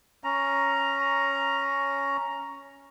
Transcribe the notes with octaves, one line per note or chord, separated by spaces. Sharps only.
C#4 A#5